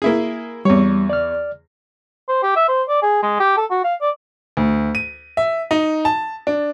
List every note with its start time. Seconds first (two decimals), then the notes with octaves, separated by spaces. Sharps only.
0.02 A#3 E4 G#4
0.65 E2 G3 C#5
1.10 D5 F6
2.29 C5
2.43 G4
2.56 E5
2.68 C5
2.89 D5
3.03 G#4
3.23 G#3
3.40 G4
3.57 A4
3.70 F#4
3.84 F5
4.01 D5
4.57 D2
4.95 D#7
5.37 E5
5.71 D#4
6.05 A5
6.47 D4